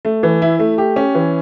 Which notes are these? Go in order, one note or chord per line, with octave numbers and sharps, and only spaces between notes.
A3
E3
E4
A3
G4
C#4
E3